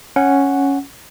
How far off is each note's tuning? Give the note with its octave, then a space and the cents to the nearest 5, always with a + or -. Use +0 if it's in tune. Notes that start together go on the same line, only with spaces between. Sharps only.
C#4 +0 F#5 +0